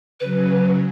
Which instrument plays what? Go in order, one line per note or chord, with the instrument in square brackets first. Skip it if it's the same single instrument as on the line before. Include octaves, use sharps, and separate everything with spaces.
[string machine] C#3 F#3 [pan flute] B4